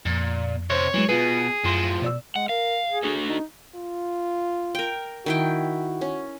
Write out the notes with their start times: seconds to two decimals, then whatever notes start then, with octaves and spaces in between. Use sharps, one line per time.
0.05 F2 A#2
0.70 C3 C5 C#5
0.94 E3 F#3 G#3
1.09 B2 F4 G#4 B4
1.64 F#2 A2 F3 C6 A#6
2.02 B2 D5 E6
2.36 G#3 F#5
2.49 A#4 F5
2.88 G#4
3.03 D4 F#4 A4
3.27 D#4
3.75 F4
4.75 A#4 G5
5.26 D#3 E4 F#4 G5
6.01 C#4